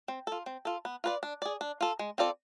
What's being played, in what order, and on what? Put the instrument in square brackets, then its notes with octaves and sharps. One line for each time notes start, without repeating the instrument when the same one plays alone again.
[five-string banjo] C4
F4 A4
C4
F4 A4
B3
F4 B4 D5
D4
G#4 D5
D4
F4 A4
G#3
C4 F4 A4 D5